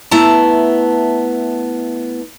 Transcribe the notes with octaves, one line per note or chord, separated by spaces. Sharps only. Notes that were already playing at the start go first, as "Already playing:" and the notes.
A3 B3 E4 A5 A#5